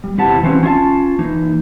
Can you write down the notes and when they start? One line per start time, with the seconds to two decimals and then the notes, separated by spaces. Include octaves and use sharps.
0.04 G3
0.17 E2 C3 E4 G4 F#5 A5
0.43 E3 F#3 C4 C#4 F#4
0.63 C#4 F4 E5 A5
1.19 E3 A#3 D#4